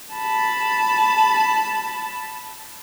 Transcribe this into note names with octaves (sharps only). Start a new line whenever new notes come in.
A5 B5